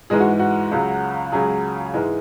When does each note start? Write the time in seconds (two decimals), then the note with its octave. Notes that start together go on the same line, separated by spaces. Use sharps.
0.10 G#2 E3 G#3 G#4
0.20 F#4
0.39 F#4
0.71 C#2 C#3 F#3
1.32 C#2 C#3 F#3 G#4
1.94 G#2 E3 G#3